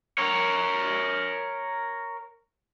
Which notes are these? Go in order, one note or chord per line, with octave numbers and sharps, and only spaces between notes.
A#4 C#5